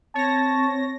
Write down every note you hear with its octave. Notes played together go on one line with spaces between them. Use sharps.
C4 C#5 A5 A#6